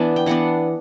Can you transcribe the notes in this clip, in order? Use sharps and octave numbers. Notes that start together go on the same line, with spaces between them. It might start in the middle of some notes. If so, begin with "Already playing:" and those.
Already playing: E3 B3 D4 A5
G5
E3 B3 D4 F#5